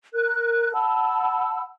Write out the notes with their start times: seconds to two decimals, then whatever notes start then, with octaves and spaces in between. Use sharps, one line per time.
0.14 A#4 F#6
0.73 F#5 A5 B5 E6